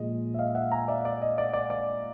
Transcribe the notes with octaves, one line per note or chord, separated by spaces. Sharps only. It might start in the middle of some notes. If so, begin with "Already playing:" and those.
Already playing: A#2 F3 G#3 D#5
E5
D#5 F5
E5 F#5
G#5 A#5
D5 E5
D5
D#5
D5
D5
D5